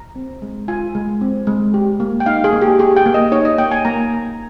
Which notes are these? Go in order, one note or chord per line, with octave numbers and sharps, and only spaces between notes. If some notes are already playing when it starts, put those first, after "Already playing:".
Already playing: A#5
C4
G#3
F4 G#5
G#3
C4
G#3
G4
A#3
G5
D#4 F5
G#4
A#3
G4
G4 G#4
G5
A#3
D#5
D#4 C#5
D#5
A#3 G5
G#5
A#3 A#5
A#3